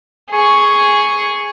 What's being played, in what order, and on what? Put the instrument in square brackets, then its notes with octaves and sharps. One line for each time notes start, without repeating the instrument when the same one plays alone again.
[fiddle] G#4 C#6